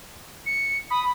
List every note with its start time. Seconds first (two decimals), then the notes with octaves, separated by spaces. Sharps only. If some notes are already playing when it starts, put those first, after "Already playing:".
0.46 C#7
0.90 B5 D#6